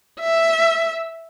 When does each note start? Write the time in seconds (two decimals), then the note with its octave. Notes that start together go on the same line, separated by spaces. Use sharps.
0.21 E5